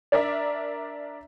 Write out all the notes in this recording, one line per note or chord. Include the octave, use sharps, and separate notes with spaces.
D4 A#4 D5 E5